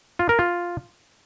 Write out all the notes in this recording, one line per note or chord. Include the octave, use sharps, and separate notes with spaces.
F4
A#4
F4